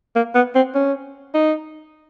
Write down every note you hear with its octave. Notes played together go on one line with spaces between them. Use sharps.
A#3
B3
C4
C#4
D#4